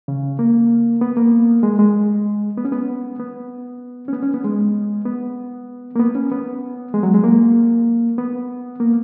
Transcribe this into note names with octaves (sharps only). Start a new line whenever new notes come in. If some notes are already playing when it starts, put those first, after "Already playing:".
C#3
A#3
B3
A#3
G#3
G#3
B3
C#4
B3
B3
C#4
B3
C#4
B3
G#3
B3
A#3
B3
C#4
B3
G#3
F#3
G#3
A#3
B3
A#3